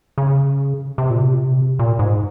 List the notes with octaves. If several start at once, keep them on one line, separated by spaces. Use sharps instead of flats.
C#3
C3
A#2
C3
A#2
G#2